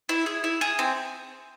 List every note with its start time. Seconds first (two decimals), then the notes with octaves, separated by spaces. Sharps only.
0.09 E4
0.26 G#4
0.44 E4
0.61 G#4
0.79 C4